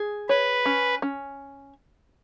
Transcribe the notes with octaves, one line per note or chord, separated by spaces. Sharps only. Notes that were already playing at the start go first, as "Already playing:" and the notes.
Already playing: G#4
B4 C#5
C#4
C#4